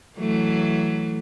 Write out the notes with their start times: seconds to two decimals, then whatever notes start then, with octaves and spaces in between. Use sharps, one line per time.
0.18 E3 F#3 A3